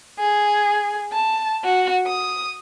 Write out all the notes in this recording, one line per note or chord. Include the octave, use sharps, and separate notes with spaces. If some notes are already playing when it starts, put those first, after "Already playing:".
G#4
A5
F#4
D#6